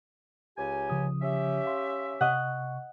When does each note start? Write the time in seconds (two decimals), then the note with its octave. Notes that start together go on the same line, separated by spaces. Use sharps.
0.58 C#2 G4 G#5
0.90 C#3 F3 D#6
1.22 C#4 G4 E5
1.66 F5 C6
2.21 C3 D#5 F#5 C#6